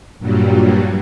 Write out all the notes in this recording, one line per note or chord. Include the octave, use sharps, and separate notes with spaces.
G2 A#2 F#3 G3